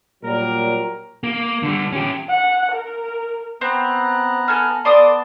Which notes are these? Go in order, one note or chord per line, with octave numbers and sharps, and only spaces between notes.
A#2 F#3 G3 A#4
A#3
D3 G3
C#4 G4
F#5
A#4
B3 C4 A#5 F#6
A4 G#5 F6
B3 A4 D5 A5 C6 D6 D#6